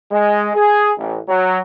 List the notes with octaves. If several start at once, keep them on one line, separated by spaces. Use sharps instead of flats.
G#3
G#4
A1
F#3